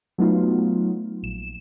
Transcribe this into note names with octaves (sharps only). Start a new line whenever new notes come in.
F#3 A3 B3 D#4 F4
A#1 E7